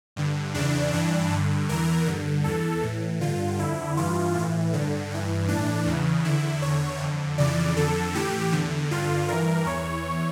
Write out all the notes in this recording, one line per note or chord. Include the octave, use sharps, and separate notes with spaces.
G2 D3
E2 C#3 E3 D4
G2 E3 D4
G2 D3
E2 E3 A#4
G2 D3
E2 E3 A4
A2 E3
G2 D3 F4
F2 D3 E4
G2 E3 F4
A2 E3
G2 D3
G2 E3
A2 E3 D4
E2 C#3 E3
E2 D3 E4
E2 D3 C#5
F2 D3
F2 C#3 E3 D5
F2 D3 A4
A2 E3 G4
E2 D3
G2 D3 F4
G2 E3 A#4
E2 E3 C#5